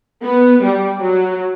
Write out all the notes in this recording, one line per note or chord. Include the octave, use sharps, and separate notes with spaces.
B3
G3
F#3